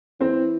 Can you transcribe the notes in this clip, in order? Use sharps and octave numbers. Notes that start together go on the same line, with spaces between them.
E3 C4